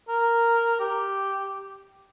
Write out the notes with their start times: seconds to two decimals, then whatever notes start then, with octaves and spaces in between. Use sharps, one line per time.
0.09 A#4
0.80 G4